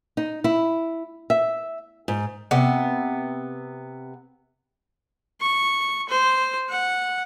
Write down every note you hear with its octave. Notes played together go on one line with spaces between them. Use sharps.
D#4
E4
E5
G#2
C3 B3
C#6
C5
F#5